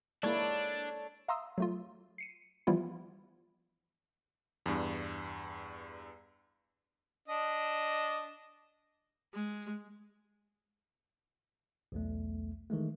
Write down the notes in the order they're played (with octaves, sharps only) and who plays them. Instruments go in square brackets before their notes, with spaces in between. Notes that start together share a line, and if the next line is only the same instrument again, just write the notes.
[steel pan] G#3 A#3 E4 [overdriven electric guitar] D4 [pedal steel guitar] A4 C#5 [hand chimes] D5
[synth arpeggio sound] E5 F5 A#5 C6 D#6 E6
F#3 A3 F4
C7 C#7 D#7
E3 F3 G3 B3 E4 F4
[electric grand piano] E2 G2
[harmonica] D4 D#5
[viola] G#3
[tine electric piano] B1 E2 A3
D#3 E3 G#3 A3